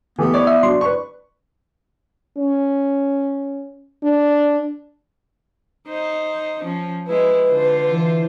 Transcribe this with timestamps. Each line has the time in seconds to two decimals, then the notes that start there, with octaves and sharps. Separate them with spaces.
0.19 E3 A3 B3 G4
0.34 E4 C#5 D5
0.47 E5
0.63 F#3 D4 C6
0.81 B4 C#6
2.37 C#4
4.03 D4
5.87 D#4 C5
6.63 F3 C#4
7.07 G#3 E4 B4
7.51 D3 F4 C5
7.91 E3